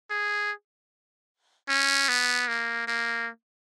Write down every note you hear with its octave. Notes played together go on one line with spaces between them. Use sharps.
G#4
C#4
B3
A#3
A#3